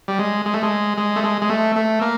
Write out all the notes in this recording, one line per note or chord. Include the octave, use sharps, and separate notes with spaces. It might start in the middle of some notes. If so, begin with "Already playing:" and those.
G3
G#3
G#3
A3
G#3
G#3
A3
G#3
G#3
A3
A3
A#3